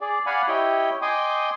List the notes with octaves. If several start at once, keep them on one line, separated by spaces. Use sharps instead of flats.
G#4 D5
D5 F5 F#5 G#5 B5
E4 G4 C#5 D#5 G5
D#5 G5 G#5 C6 D6 D#6